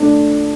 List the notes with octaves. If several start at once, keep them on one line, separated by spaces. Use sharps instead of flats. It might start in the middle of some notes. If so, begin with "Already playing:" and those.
Already playing: A3 D4